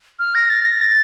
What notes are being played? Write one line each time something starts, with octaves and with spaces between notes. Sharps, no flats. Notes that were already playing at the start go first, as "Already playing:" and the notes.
F6
A#6
A6
A#6
A6